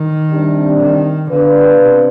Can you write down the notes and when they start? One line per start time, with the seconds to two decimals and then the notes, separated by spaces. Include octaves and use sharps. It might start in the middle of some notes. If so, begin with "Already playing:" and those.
Already playing: D#3
0.31 C3 G3 D4
0.80 D#3
1.30 D3 B3 D4 F4 B4
1.80 C3